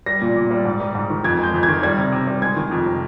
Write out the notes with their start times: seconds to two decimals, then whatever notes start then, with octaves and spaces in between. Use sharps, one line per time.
0.06 G3 A#6
0.22 A#2
0.36 A#2
0.51 G3
0.65 G#2
0.80 G3
0.95 G#2
1.10 D#3
1.24 F2 G#6
1.39 G#3 G6
1.54 F2
1.63 G#6
1.68 D#3
1.83 G3 G#6
1.98 C3
2.12 C3
2.27 G3
2.42 G#3 G#6
2.56 D#3
2.71 F2
2.86 C3